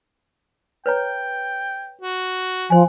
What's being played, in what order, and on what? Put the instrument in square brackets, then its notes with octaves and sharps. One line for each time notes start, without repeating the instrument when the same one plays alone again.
[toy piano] B4 C#5 A#5 [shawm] G5
[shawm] F#4
[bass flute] F3 [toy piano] C5 G#5